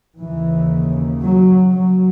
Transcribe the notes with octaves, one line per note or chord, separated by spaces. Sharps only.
D#2 C#3 E3
F#3
F#3